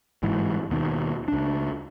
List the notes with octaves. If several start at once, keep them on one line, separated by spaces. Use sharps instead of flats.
G1 G#2 E3
D#2 B2 D#3
C#2 D4